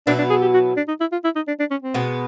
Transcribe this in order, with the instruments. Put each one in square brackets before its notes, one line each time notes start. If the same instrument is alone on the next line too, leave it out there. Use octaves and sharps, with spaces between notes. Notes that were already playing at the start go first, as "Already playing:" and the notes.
[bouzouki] B2 F#3 B3 E4 [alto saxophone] D4
[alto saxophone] D4
G#4
G4
F#4
D4
D#4
E4
F4
E4
D#4
D4
D4
C#4
C4
[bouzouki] B2 G#3 B3